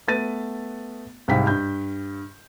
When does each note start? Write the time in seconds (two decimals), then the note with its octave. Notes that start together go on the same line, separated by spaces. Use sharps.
0.08 A3 B3 B4 A6 D#7
1.28 C2 G#2 F5 G5 B6
1.47 G2 G6